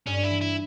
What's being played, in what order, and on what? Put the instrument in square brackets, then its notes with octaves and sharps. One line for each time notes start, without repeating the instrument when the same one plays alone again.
[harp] G2 [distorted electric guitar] C#4
[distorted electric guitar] E4
[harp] E3
[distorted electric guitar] E4